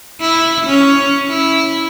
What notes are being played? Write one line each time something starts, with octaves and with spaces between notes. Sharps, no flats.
E4
C#4
E4